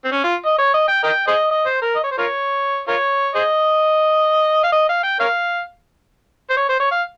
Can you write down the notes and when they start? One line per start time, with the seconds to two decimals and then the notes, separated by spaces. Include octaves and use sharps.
0.05 C4
0.12 C#4
0.24 F4
0.46 D#5
0.58 C#5
0.74 D#5
0.88 G5
1.04 A#4 D#5 G5
1.28 G#4 C5 D#5
1.51 D#5
1.66 C5
1.81 A#4
1.96 D#5
2.04 C#5
2.11 C5
2.18 F4 A#4 C#5
2.88 F4 A#4 C#5
3.35 G#4 C5 D#5
4.64 F5
4.72 D#5
4.89 F5
5.03 G5
5.20 A#4 C#5 F5
6.50 C5
6.57 C#5
6.69 C5
6.80 C#5
6.91 F5